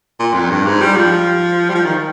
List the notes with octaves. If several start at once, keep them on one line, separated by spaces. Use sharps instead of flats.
A#2
F2
G2
G#2
G3
F3
G3
F3
D#3